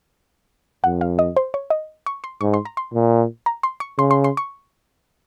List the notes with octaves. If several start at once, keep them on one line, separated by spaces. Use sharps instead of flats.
F2 F#5
F5
D#5
C5
C#5
D#5
C#6
C6
G#2 C#6
C6
A#5
C6
A#2
A#5
C6
C#6
C#3 C6
C6
C6
C#6